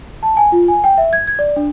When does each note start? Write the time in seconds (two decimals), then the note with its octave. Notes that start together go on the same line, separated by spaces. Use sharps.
0.23 A5
0.37 G#5
0.52 F4
0.68 G#5
0.84 G5
0.98 E5
1.13 G#6
1.27 G#6
1.39 D5
1.56 D4